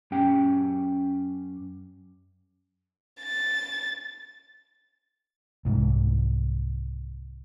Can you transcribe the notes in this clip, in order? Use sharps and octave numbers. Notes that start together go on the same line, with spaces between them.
F#2 C#4 G4 G5
A6
C2 G#2